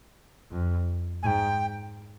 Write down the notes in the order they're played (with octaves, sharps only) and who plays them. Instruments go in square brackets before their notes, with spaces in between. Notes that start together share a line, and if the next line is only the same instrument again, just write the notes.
[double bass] F2
[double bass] G#2 [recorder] G5 G#5